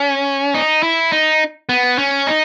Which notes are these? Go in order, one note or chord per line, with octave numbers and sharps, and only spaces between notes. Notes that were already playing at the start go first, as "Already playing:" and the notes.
Already playing: C#4
D#4
E4
D#4
B3
C#4
D#4